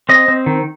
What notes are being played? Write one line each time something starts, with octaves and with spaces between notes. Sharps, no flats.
C4 D#5
C4
D#3